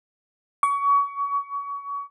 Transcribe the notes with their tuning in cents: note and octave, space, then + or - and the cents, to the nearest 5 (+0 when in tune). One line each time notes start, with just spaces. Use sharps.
C#6 +30